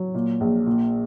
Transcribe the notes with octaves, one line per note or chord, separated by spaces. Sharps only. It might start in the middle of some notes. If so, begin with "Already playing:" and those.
Already playing: F#3
A#2
A#1
A#2